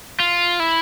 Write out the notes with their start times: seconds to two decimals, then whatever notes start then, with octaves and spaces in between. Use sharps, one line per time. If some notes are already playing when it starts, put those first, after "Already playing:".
0.20 F4
0.60 E4